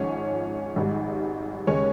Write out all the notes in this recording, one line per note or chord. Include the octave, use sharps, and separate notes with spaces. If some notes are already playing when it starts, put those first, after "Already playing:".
Already playing: G#1 G#2 F3 C#4 C#5
G#1 G#2 G3
D#2 C#3 G#3 C#4 C#5